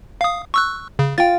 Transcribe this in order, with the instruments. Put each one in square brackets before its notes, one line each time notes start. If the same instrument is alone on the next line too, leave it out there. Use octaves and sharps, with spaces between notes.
[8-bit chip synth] F5 D#6
C#6 E6 F#6
C#3
[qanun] F4 [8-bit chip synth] G5 A6